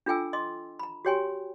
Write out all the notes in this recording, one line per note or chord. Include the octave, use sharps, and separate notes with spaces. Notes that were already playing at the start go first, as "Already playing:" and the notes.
D4 F4 A4 G5 G#5 E6
D#5 C6 D6 D#6
A#5 B5
F#4 G4 C#5 G5 G#5 C6